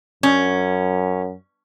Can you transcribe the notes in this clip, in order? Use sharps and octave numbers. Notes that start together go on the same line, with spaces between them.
F#2 C#4